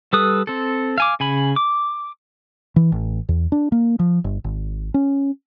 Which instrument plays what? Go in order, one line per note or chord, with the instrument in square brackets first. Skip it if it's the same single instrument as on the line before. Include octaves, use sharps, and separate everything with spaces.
[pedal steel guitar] G3 A4 B4 D#6
C4 A4
F5 G#5 D6
C#3 G#5 B5
D6
[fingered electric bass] E3
A1
E2
D4
A#3
F3
G1
G#1
C#4